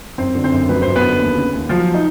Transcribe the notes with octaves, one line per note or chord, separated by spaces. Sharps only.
F#2 C4 C5
D3
C4 C5
F#2
F#3 B4
F#2 C5
B3 B4
D3
D#2
C#3
D#2
F3 F#3 F4
D#4